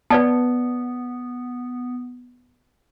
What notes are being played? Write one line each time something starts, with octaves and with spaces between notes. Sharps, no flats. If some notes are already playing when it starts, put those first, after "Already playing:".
B3 B4 D5 A5